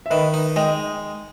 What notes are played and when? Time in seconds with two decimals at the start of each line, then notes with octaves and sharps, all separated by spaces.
0.06 E5
0.10 D#3 B4 D#5
0.34 D#4
0.56 G#3 D#5 G5